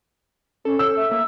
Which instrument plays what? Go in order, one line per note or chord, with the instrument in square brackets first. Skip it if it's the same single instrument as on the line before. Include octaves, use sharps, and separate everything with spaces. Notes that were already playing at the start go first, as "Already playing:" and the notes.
[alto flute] C#4 [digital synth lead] A4
[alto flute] C#5 [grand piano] E6
[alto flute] E5
[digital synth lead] A#3